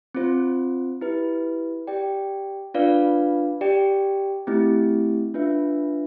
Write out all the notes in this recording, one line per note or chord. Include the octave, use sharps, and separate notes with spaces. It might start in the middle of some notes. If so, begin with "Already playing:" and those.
C4 F4 C5
E4 G4 B4
G4 D5 G5
D4 F4 B4 D5 F5
G4 D5 G5
A3 C4 E4 G4
D4 F4 B4 E5